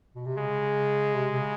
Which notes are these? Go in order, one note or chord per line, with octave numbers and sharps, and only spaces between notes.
B2
C3
C#3 G#3
C3
C3
C#3